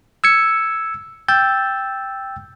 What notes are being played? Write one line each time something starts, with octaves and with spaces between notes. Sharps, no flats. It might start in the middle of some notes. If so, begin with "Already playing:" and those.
E6 G#6 C#7
G5 E6 G6 A6